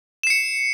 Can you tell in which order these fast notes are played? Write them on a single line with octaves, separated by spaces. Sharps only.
E7 C7 C#7